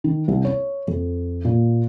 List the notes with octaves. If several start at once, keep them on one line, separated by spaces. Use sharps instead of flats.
D#3
C2
C#5
F2
A#2